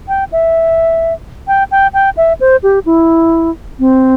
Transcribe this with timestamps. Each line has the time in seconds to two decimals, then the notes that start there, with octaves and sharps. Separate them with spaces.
0.08 G5
0.32 E5
1.47 G5
1.71 G5
1.93 G5
2.17 E5
2.40 C5
2.63 G4
2.86 E4
3.79 C4